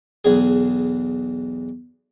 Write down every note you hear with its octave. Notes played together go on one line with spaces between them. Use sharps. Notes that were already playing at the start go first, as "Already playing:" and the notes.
B1 E2 G#4